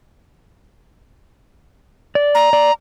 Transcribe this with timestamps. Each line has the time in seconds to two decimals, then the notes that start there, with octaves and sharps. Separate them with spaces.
2.15 D5
2.35 A#5
2.53 D5